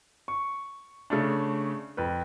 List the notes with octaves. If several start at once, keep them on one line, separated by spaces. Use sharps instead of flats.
C#6
C#3 A3 D4
F2 B4